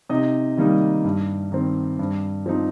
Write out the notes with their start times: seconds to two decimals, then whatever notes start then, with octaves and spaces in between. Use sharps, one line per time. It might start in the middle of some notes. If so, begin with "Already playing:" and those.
0.10 C3 D#4 D#5
0.57 D#3 G3 A#3 D#4
1.04 G2
1.52 D#3 C4
1.99 G2
2.46 F3 C4 D#4